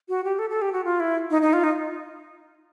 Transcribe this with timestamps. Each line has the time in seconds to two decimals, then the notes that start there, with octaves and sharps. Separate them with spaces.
0.09 F#4
0.24 G4
0.39 A4
0.50 A4
0.62 G4
0.72 F#4
0.85 F4
1.00 E4
1.30 D#4
1.42 D#4
1.53 F4
1.64 D#4